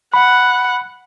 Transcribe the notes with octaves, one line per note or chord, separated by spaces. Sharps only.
F#5 B5